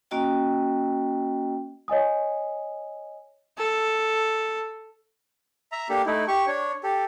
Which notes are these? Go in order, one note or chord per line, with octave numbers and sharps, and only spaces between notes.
A#3 C#4 F#4 D#5 G5
C#5 D#5 G#5 D#6
A4
E5 A#5
A#3 D4 G4 A4
A3 D#4 E4
G4 C#6
D4 C#5
G4 A4